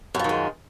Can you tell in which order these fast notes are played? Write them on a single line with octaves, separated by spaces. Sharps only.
F#2 F3 D#3 G#3